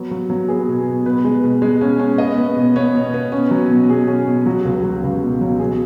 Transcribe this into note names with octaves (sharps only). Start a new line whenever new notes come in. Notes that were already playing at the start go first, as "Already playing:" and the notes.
Already playing: F#3 B3
F#3
F#3
B3 G#4
B2
B2
B2 B4
G#3
B2
G#3
C#4
C#4
B3 D#5
B3
B2
B3 C#5
B2
B3
C#4
F#3
B2
B2 G#4
C#4
B2
F#3 F#4
C#2
F#3
C#2
B2
F#3
B2 G#4